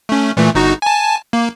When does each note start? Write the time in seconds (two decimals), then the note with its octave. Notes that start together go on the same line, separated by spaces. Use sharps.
0.09 A3 C#4
0.37 A#2 E3 A3
0.55 G1 D#4 F#4
0.82 G#5 A5
1.33 A#3